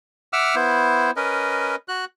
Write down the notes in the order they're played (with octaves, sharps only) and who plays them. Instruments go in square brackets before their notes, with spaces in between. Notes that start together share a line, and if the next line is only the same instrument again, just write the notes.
[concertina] E5 F#5 D6 E6 F6
B3 E4 C5
C#4 A#4 B4 D#5
F#4 F#6